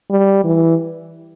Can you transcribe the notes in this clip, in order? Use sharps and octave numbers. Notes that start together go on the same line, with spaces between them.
G3
E3